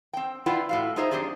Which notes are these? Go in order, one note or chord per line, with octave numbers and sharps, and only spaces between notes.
C4 G5
E4 F4 B4 D5 F#5 G5
A2 F#4 F5
D#4 F4 G#4 C5 D#5 E5
F#2 C4 D4 G4 G#4 D5